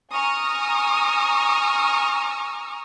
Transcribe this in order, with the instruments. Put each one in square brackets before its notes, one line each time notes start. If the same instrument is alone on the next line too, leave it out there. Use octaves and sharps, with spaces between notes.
[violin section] G#5 A#5 C#6 D#6 F6